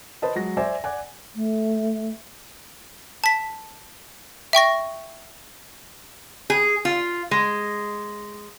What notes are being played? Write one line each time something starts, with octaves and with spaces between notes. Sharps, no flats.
B4 C5 D#5 A5
F#3 G#3 A#6
C5 D5 E5 G#5
D5 F#5 G#5
A3
A5 B6
E5 G5 C#6 A#6
G#4
F4
G#3